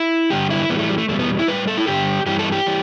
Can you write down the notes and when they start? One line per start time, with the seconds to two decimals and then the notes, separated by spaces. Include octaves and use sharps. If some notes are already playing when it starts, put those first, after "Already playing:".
Already playing: E4
0.30 G2 D3 G3 G4
0.50 E4
0.69 A2 E3 G3 B3
0.79 A3
0.89 G3
0.98 A3
1.08 E2 B2 G3 A3
1.19 B3
1.39 E4
1.48 A2 G3 B4
1.68 A4
1.78 E4
1.87 G2 D3 G3 G4
2.26 G2 E3 G3 G4
2.39 A4
2.52 G4
2.66 E3 G3